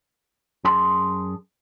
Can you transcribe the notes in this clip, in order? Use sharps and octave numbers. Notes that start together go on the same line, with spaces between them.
F#2 G#4 A5 C6